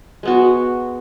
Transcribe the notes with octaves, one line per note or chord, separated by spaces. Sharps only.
G#3 B3 F#4